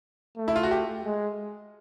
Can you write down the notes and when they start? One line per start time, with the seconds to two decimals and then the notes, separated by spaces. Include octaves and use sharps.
0.37 A3
0.48 E4
0.56 F4
0.63 F#4
0.71 G4
1.05 G#3